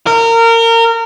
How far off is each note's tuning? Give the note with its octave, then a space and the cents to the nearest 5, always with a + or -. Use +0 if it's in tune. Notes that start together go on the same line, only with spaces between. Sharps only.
A#4 -25